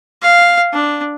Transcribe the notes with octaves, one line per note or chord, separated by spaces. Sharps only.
F5
D4